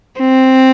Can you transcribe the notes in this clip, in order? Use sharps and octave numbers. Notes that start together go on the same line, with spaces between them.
C4